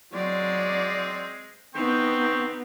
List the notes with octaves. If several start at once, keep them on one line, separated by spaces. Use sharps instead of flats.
F#3 G#3 C4 D5
B3 C4 D#4 G5 C#6